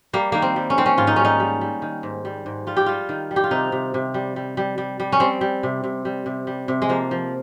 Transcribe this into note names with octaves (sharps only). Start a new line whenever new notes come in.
G3 A#3
D#3 A#3
C4
G3
C#4
D#3 C4
C#4
G#2 F4
D#4
G3 C#4
D#4
G3
G3
D#3
G#2
G3
G#2
G3 F4
G4
G3 F4
D#3
G3
G4
F4
C3 D#4
C3
C3
G3
G3
G3
G3
G3
C#4
G3 C4
G3
C3
C3
G3
C3
G3
C3
G#3
F3 A#3
F3